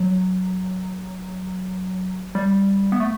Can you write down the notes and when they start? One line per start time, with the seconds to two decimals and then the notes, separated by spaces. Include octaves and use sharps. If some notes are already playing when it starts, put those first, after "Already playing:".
Already playing: F#3
2.35 G3
2.92 B3
3.00 A3